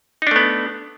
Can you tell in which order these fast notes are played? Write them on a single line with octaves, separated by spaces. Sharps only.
D#4 D4 A3 B3